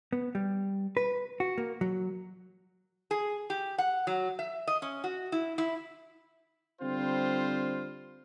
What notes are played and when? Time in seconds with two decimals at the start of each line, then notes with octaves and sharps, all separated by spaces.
0.13 B3
0.35 G3
0.97 B4
1.40 F#4
1.58 A#3
1.81 F#3
3.11 G#4
3.50 G4
3.78 F#5
4.07 F#3
4.39 E5
4.68 D#5
4.82 C#4
5.04 F#4
5.32 E4
5.58 E4
6.82 D3 G3 C4 F4 C5